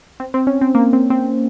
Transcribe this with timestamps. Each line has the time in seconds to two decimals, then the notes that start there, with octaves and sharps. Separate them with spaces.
0.20 C4
0.34 C4
0.47 C#4
0.61 C4
0.75 A#3
0.93 C4
1.10 C4